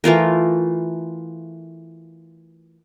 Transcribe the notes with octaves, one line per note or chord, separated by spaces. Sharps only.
E3 A3 F4 A#4